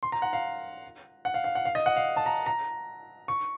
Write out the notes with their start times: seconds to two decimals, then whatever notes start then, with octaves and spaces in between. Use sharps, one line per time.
0.03 C6
0.12 A#5
0.22 F#5
0.33 F5
1.25 F#5
1.34 F5
1.44 F5
1.55 F#5
1.65 F5
1.75 D#5
1.86 F#5
1.96 F5
2.17 A5
2.26 A#5
2.46 A#5
3.28 C#6